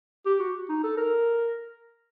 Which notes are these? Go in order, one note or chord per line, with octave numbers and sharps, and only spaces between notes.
G4
F#4
D#4
A4
A#4